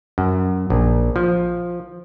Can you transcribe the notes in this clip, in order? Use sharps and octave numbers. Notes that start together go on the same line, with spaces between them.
F#2
A#1
F3